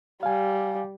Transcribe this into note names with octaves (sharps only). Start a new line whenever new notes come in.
G3 F5 G#5